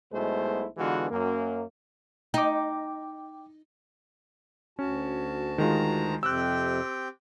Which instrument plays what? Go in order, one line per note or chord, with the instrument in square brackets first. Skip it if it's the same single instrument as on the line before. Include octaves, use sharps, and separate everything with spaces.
[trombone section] B1 B2 G#3 A3 E4 C5
D3 E3 G#3 B3 F4 F#4
F#2 A#3
[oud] D#4 [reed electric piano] G5 D6
[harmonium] D2 F#4 A5 [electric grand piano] C#4
[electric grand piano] D#3 G#3 F4 [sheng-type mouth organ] A#5
[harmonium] F2 C3 [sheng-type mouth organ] C4 G4 G5 [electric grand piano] E6 F#6